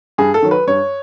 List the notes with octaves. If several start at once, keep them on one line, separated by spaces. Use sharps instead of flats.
G2 G#4
A4
D#3 F#3
B4
G2 C#5